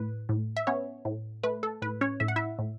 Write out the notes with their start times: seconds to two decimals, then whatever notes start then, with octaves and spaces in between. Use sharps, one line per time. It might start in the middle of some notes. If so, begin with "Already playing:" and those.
Already playing: A2 B4
0.29 A2
0.57 E5
0.67 B3 C#4 C#5
1.05 A2
1.43 A3 B4
1.63 A4
1.82 A2 B4
2.01 C#4 C#5
2.20 A2 E5
2.28 F#5
2.36 E4 E5
2.59 A2